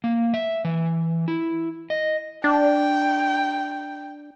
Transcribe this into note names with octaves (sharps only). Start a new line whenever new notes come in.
A#3
E5
E3
E4
D#5
D4 G5